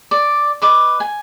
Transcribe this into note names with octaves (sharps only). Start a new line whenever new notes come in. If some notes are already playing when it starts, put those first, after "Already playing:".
D5
B4 D#5 D6
G#5